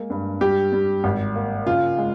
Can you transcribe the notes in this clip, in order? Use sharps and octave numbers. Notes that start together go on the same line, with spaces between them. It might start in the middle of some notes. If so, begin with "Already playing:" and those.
Already playing: G#3 A#3
G2
G3 G4
G3
G#1
A#3
C#3 F4
G#3